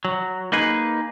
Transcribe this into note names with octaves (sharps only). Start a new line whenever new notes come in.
F#3
A#3 D#4 G#4 B4